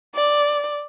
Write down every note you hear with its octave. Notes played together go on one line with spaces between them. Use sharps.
D5